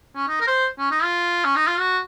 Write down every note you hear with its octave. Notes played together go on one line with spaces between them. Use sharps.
C#4
D#4
A#4
C5
C#4
D#4
F4
C#4
D#4
F4
F#4